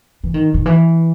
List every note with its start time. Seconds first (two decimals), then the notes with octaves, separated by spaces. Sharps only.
0.24 E3
0.34 D#3
0.54 D#3
0.66 E3